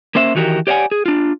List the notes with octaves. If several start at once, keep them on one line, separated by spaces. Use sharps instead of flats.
A#3 C#4 C5 E5
D#3 E3 F#4 G4 A#4
G4 C#5 D5 E5 F#5 G#5
G#4
D4 F4